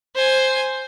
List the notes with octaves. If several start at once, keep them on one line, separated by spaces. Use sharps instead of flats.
C5 G#5